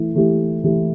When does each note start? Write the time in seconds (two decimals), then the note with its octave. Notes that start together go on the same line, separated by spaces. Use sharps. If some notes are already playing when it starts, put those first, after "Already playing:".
Already playing: E3 A3 E4
0.15 E3 A3 E4 G4
0.64 E3 A3 E4 G4